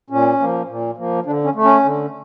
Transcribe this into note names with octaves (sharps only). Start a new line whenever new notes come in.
A#2 C#4
F3 A#3
A#2
F3 A#3
D3 D4
C#4
A3
C#4
D3